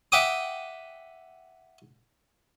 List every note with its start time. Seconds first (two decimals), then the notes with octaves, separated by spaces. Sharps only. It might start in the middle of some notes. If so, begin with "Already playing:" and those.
0.12 E5 F#5 G5 D6 D#6